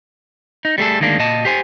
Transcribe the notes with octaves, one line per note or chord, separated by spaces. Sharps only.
D#4
G3 A3 G#4 A4
D2 D#3 G#3 A#3 D4
A#2 D#5 A5
G4 C5 G#5